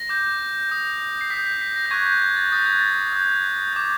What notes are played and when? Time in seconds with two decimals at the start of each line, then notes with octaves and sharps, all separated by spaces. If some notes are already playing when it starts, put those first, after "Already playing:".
Already playing: A#6
0.09 D6 G6
0.70 D#6 G6
1.21 C7
1.30 D#6 G6 B6
1.46 B6
1.61 B6
1.76 A#6
1.86 G6
1.91 C#6 F#6 G#6
2.06 G6
2.22 G#6
2.36 A6
2.52 D#6 F#6 A6
2.66 G#6
2.79 A6
3.13 D#6 G6
3.73 D6 G6